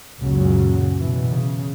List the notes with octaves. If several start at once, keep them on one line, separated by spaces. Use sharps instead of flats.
C#2 F#2 A#2 C#3 F#3
B2 E3
C#3